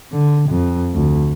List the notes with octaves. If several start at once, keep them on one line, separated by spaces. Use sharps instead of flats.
D3
F2
D2